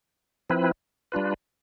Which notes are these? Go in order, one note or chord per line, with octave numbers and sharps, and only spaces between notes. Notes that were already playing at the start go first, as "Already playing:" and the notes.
F3 C4 E4 B4
G3 D4 F4 B4